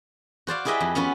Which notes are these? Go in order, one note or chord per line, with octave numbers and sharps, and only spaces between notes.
F#4 C5 D5 F5
E4 G4 G#4 B4 D#5 E5
F2
B3 C#4 F4 F#4 B4